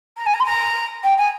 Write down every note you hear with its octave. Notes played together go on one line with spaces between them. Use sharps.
A#5
G#5
A#5
C6
A#5
G5
G#5